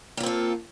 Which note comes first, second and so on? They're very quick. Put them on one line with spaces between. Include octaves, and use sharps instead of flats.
A#3 F4 C4 A4